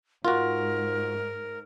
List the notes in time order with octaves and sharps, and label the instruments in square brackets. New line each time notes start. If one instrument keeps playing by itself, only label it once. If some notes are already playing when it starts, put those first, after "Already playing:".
[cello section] G#2 [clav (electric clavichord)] F4 F#4 [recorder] A#4